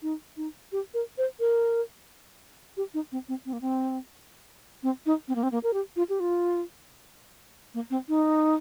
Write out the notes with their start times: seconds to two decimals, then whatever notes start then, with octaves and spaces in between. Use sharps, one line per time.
0.02 D#4
0.37 D#4
0.72 G4
0.94 A#4
1.18 C5
1.40 A#4
2.77 G4
2.94 D#4
3.12 C4
3.28 C4
3.45 C4
3.53 A#3
3.61 C4
4.83 C4
5.06 D#4
5.28 C4
5.35 A#3
5.43 C4
5.52 A#3
5.63 A#4
5.73 G4
5.96 F4
6.09 G4
6.20 F4
7.74 A#3
7.90 C4
8.09 D#4